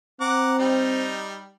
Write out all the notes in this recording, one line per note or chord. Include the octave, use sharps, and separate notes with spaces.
C4 F#5 A#5 D6
G3 D#4